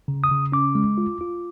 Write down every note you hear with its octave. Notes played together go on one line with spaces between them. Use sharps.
C#3
D#6
C#3
C#4 D6
G#3
F4
F4